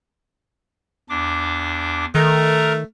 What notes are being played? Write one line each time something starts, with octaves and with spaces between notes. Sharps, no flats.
E2 D4 D6
D#3 A3 A#4 A#5